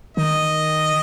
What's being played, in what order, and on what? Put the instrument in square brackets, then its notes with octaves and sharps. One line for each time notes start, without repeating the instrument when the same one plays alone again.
[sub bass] D#3 [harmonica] D#5